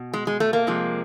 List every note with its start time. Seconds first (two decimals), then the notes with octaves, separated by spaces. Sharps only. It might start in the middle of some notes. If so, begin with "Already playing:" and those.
Already playing: B2
0.14 G#3
0.27 G#3
0.40 A3
0.53 A#3
0.67 C3 F3 G#3